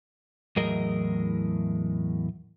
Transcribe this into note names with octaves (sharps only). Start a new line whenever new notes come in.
E2 A2 F#3 G#4 A#4 D#5